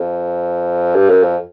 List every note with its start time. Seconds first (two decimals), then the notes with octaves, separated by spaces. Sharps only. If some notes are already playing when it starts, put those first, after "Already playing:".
Already playing: F2
0.95 G2
1.09 F#2
1.23 F2